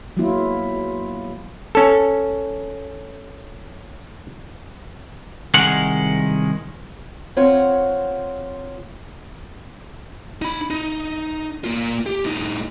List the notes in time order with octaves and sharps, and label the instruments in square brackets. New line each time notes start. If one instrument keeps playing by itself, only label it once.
[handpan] F#3 G#3 A#3 B3 E4 F4
[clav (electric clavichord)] C#4 A4
[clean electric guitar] C2 D#3 G#3 F#5
[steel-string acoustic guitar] C4 F4 C#5 F#5
[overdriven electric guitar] D#4 B5
D#4
A#3 F4
G4
A2 D#4